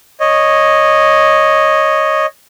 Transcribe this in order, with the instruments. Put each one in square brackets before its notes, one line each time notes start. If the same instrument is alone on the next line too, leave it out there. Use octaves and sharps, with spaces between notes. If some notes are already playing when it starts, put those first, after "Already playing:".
[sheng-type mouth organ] C#5 D#5